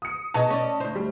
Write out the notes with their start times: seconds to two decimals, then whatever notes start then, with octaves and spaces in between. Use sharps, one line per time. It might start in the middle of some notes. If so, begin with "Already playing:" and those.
0.02 D#6 C#7
0.34 B2 G#4 D#5 A5
0.50 C#4 D5
0.80 D2 C5
0.95 G3